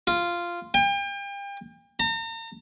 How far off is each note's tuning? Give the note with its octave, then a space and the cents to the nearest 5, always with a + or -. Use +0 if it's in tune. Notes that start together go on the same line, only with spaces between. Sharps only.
F4 -10
G5 +35
A#5 -40